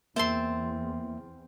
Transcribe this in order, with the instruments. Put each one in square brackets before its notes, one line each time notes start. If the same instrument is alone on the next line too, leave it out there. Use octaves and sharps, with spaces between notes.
[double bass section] E2 [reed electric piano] A#3 E5 [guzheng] C4 A5 C6